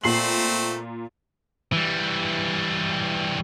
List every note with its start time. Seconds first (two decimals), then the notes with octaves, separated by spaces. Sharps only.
0.04 A#2 A3 C4 C7 F#7
1.73 E3 G3